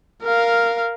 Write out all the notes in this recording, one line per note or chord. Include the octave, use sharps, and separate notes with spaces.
A#4 F5